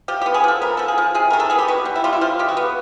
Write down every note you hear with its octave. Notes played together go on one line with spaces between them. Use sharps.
F3 G4
G4
B3
G#4
F3 A4
B3 A#4
F3 A4
G#4
F3
C3 G#4
D#3 A#4
A4
B3 G#4
G4
B3 F#4
G3
E4
G3 F4
E4
F3 F4
C#3 G4
F#4
B3